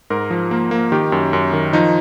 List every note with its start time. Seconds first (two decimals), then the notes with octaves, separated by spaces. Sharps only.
0.10 G#2 A#4
0.30 F3
0.51 A#3
0.71 A#3
0.92 D#3 G4
1.12 F#2
1.33 F#2
1.53 D#3
1.73 F3 D#4